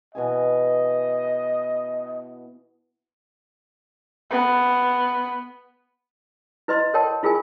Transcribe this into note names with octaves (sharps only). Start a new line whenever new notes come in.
B2 E3 D#5 G#5
B3
E4 B4 D#5 C6
A4 A#4 C#5 G5 A5
E4 F4 G#4 A#4 G#5